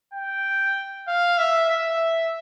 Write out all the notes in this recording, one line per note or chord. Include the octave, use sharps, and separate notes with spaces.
G5
F5
E5
E5